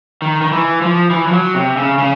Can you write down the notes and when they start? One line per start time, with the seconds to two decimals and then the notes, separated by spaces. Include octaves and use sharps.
0.22 D#3
0.42 D#3
0.52 E3
0.82 F3
1.10 E3
1.27 F3
1.33 F#3
1.55 C3
1.77 C#3
1.98 C#3